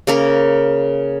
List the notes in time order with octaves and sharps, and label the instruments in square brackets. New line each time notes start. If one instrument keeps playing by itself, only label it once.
[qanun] C#3 A#3 A#4